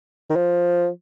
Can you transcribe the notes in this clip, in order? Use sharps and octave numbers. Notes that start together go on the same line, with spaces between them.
D#3
F3